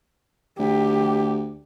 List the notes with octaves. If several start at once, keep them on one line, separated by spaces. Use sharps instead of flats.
D2 G4